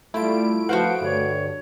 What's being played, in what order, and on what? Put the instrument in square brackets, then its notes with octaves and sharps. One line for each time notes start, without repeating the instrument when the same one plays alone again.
[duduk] G3 [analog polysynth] A3 D7 [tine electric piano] E4 F4
[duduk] F3 [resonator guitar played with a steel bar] F#4 C5 F#5 [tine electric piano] B4 F5
[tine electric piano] G2 D3 G3 [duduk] C#5